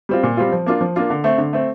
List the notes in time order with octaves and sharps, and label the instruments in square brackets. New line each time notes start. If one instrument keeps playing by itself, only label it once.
[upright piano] G3 C4 F4
A#2
G3 C4 F4
F3
A#3 D4 F4
F3
A#3 D4 F4
D3
A3 C4
D3
A3 C4